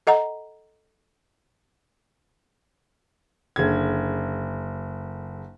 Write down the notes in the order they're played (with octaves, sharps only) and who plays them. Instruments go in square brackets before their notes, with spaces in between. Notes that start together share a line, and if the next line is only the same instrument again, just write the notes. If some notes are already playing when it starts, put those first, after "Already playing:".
[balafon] A4 D#5 F#5 A#5
[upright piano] F#1 D3 G#6